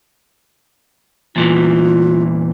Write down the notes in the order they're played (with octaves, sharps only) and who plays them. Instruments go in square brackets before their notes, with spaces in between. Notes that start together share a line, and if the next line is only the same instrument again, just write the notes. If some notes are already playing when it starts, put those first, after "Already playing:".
[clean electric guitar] E2 A#2 E3 [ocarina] F4